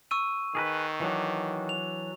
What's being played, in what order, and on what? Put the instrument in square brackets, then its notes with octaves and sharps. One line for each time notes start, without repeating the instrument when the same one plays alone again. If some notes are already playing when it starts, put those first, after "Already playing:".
[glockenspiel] C#6 E6 D#7
[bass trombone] D#3 [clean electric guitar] G#4 A#4 B4
[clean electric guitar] E3 F#3 D4
[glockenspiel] F7